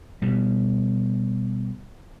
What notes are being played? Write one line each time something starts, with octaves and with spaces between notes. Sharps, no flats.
B2 G3